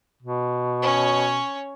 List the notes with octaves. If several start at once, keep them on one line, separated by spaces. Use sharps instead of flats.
B2
C#4 C#5